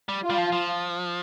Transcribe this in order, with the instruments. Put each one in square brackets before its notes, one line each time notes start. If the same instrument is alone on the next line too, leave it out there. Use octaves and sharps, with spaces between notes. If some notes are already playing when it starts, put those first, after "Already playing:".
[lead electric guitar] G3
[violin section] F4
[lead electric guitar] G3
F3
F3